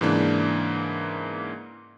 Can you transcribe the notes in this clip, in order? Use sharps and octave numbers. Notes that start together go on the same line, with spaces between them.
G#2 C#3 E3 A#3 D4